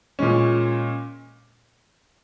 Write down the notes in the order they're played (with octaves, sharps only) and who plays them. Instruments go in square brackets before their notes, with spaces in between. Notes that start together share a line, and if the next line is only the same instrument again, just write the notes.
[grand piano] A#2 G#3 C#4